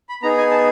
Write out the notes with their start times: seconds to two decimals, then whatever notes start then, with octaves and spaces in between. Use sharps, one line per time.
0.09 B5
0.23 B3 D#4 G#4 A#5
0.37 G#5
0.51 A5